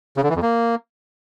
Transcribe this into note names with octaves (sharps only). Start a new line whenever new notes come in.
C#3
D3
E3
F2
A#3